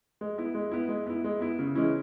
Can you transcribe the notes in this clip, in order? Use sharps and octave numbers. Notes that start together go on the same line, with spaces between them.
G#3
B3 E4
G#3
B3 E4
G#3
B3 E4
G#3
B3 E4
C#3
E3 G#3 C#4 E4